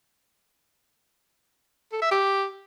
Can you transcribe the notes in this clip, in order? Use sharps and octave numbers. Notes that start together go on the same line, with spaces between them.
A4
E5
G4